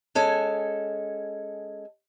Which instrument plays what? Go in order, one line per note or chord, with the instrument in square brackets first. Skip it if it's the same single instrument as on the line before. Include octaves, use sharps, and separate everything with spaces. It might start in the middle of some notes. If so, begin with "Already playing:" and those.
[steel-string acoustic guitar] G#3 C#4 A4 G#5